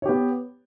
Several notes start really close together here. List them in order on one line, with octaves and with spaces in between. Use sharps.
C#5 G4 B3